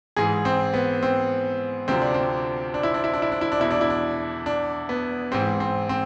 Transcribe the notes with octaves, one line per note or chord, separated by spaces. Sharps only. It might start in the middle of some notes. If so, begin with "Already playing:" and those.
G#2 E3 G#4
C4
B3
C4
D2 C3 F3 C4
D4
C4
D4
E4
D4
E4
D4
E4
D4
E4
D4
E2 B2 E4
D4
E4
D4
D4
B3
G#2 E3 C4
C4
C4